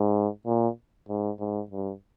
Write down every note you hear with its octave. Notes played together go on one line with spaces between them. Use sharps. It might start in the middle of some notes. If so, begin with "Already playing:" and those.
Already playing: G#2
A#2
G#2
G#2
G2